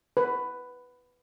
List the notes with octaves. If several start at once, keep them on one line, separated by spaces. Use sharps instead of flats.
B4